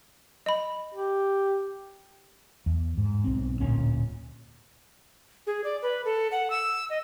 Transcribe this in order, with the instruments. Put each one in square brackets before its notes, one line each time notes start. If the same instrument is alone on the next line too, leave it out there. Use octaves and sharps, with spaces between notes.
[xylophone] D#5 B5
[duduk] G4
[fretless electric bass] E2
G#2
B1 C4
D1 A#2 A#3 C#4
[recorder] G#4
D5
B4
A4
F#5
E6
D#5